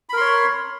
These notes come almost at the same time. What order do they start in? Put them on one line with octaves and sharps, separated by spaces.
B5 A#4 C6 C#5